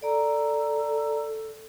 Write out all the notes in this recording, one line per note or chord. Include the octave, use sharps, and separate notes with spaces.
A4 D5 A#5